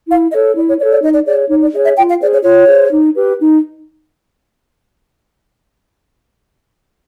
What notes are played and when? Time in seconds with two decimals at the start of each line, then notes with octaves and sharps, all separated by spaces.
0.08 E4 F5
0.32 A4 C#5 D#5
0.56 E4 D5
0.68 C#5
0.79 C#5 D5
0.84 A4
0.91 D5
1.03 D#4 D#5
1.15 D5
1.26 G#4 C#5 D5
1.50 D#4 C#5
1.62 D5
1.73 G#4 D#5
1.77 C#5
1.85 E5
1.97 F4 G5
2.09 F5
2.21 G#4 C5 D5
2.33 C#5
2.44 F4 C#5
2.67 G#4 C5
2.91 D#4
3.15 G4 B4
3.39 D#4